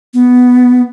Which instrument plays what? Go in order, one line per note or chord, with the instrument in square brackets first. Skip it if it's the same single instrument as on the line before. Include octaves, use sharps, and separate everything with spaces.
[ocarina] B3